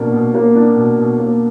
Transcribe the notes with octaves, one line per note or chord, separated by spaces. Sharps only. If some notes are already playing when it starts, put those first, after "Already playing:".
Already playing: B2 A#3 D4
B2
A#3
D4
B2
B2
A#3